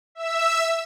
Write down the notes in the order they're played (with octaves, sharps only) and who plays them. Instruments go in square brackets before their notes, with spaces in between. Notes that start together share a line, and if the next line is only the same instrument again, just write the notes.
[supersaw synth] E5 E6